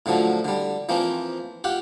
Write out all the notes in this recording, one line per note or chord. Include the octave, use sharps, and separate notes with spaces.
A2 D3 F3 F#3
D3 G3
E3 F3 A#3 C4
F4 G4 F#5